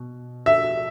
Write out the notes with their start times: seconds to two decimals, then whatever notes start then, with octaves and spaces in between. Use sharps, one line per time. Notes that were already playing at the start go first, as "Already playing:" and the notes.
Already playing: B2
0.46 E5